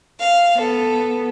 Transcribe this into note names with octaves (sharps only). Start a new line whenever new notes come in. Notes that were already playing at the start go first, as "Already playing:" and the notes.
F5
B3 A4